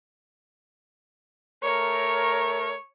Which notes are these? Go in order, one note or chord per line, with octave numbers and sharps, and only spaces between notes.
A3 A#4 C#5